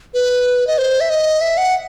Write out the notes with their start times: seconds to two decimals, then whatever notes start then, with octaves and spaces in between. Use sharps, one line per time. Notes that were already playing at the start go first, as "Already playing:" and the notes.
0.14 B4
0.67 D#5
0.78 C5
1.00 E5
1.10 D#5
1.41 E5
1.57 F#5